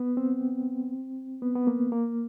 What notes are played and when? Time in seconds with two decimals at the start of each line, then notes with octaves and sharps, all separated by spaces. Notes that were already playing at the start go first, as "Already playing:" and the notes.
Already playing: B3
0.17 C4
1.42 B3
1.55 B3
1.67 A#3
1.92 A#3